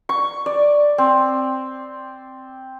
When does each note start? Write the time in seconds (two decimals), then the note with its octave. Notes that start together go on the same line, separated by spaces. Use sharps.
0.09 C#6
0.46 D5
0.98 C4